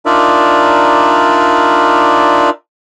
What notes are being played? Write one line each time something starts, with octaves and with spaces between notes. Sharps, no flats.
D4 D#4 F4 A#4 D5 E5